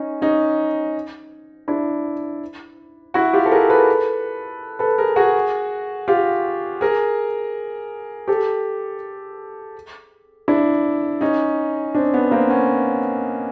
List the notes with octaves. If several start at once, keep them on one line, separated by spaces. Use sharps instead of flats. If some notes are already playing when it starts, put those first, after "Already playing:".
Already playing: C#4 D#4
C#4 D#4
D4 E4
E4 F#4
F4 G4
A4
G#4 A#4
A4 B4
A4 B4
G#4 A#4
F#4 G#4
F4 G4
G#4 A#4
G4 A4
D4 E4
C#4 D#4
C4 D4
B3
A#3 C4
B3 C#4